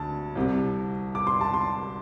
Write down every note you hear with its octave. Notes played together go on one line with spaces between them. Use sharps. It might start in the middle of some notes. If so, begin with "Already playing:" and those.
Already playing: D2 D3 A5
C2 C3
D6
C6
A5
C6